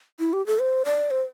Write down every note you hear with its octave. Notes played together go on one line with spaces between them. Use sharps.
E4
G4
A4
C5
D5
C5